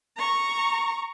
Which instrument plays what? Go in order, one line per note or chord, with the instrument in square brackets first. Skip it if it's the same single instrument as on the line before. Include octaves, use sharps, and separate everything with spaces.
[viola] A#5 C#6